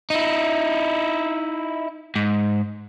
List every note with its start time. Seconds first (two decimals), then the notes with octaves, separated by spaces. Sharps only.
0.10 D#4 E4
2.16 G#2